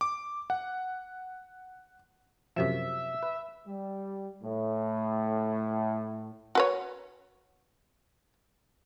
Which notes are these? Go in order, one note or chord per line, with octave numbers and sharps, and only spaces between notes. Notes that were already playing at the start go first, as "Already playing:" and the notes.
D6
F#5
F#2 C3 F3 E5
B4
G3
A2
F#4 B4 C#5